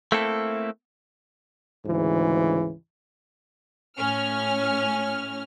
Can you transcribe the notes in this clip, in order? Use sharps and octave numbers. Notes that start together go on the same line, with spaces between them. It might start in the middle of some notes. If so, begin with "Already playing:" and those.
A3 A#3 C4 E4 A4
D2 G#2 C#3 E3
A2 C#4 F6